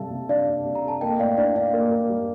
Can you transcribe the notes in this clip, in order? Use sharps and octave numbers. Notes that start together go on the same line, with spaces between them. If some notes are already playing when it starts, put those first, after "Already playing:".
Already playing: C3 G3 A4 F5 A5
C3
D4 D5 F5
C3
C3
A#5
A4 A5
A#3 D#5 G5
A2 D5 F5
D4 D5 F5
D4 D5 F5
A#3
A#3
G3